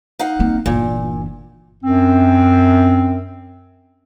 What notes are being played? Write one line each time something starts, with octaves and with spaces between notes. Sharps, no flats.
D#4 F5 F#5
A#3 C4
G1 A#2 E3
F#2 C4